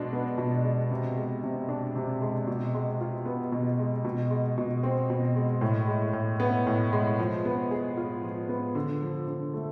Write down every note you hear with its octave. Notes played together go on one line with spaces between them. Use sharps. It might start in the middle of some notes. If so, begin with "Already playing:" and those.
Already playing: B2 G#3 D4
B3
B2
G#3
C3
G#3
C3
D4
C3
G#3
B2
G#3
F4
B3
B2
G#3
B2
G#3
B2
C4
B2
G#3
A2
G#3
A2
B3
A2
G#3
F3
B3
G#4
F4
F3
B3
D3
F3
D3
A3